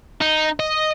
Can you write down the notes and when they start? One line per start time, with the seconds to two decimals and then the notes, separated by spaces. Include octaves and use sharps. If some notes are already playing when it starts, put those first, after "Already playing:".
0.21 D#4
0.60 D#5